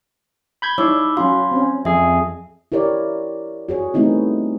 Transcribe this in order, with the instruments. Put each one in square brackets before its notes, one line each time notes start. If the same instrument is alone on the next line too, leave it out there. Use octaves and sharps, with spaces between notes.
[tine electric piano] B5 G6 G#6
[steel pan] G3 E4 C#5 [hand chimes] D#4 D6 E6
[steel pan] F#3 C#4 F#4 [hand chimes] F5 C6
[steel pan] C4 C#4
[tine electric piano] F2 G#4 [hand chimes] E5
[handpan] E4 G4 A#4 C#5 D5
F#4 G#4 C#5
G3 A3 B3 C4 D#4 E4